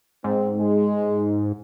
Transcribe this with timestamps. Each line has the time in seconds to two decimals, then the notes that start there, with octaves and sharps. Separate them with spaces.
0.24 G#2 C4
0.56 G#3